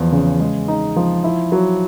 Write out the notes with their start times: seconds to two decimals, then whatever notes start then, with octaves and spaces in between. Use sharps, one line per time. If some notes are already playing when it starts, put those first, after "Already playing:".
Already playing: E2 F3
0.12 C#3
0.40 G#3
0.68 D#4
0.96 F3
1.24 E4
1.52 F#3